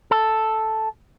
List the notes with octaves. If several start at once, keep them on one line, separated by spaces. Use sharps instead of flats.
A4